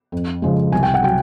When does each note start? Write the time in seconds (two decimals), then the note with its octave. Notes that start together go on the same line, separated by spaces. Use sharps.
0.12 F2
0.42 C#3 F3 G#3
0.72 C2 G#5
0.83 G5
0.94 F#5
1.03 F#3 G5